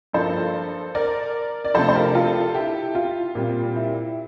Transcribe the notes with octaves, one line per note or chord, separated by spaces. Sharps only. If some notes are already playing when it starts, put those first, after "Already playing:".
G2 F3 A#3 A4 C5
A#4 D5
D5
C3 F3 A3 D4 A4 C5
C5
G4 A#4
F4 A4
E4 G4
F4
A#2 G3 C4
E4